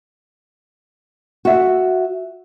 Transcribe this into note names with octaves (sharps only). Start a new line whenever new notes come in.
F#4 E5